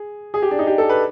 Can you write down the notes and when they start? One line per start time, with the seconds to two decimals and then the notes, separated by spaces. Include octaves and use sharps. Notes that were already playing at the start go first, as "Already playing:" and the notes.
Already playing: G#4
0.34 G#4
0.42 G4
0.51 D4
0.59 D#4
0.67 G4
0.78 A4
0.89 B4